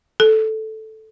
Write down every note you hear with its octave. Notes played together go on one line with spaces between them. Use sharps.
A4